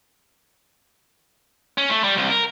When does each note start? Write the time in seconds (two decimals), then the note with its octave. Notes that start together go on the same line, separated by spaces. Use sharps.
1.78 C#4
1.90 A3
2.04 G3
2.17 C2
2.30 A#4